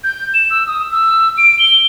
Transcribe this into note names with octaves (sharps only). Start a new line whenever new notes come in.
G6
E7
E6
D#6
E6
D7
G7